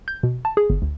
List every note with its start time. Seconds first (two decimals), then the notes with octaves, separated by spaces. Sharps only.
0.08 G6
0.23 B2
0.45 A5
0.57 G#4
0.70 G1
0.82 D2